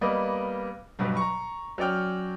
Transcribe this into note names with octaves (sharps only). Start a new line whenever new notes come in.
G3 A#3 B3 D5 D#5
G2 B2 F#3 G3 B3
A#5 C#6
F#3 C#4 D5 G5 F6